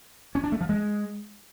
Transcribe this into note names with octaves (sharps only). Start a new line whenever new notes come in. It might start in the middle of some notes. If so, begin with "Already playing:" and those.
C#4
D4
A3
F3
G#3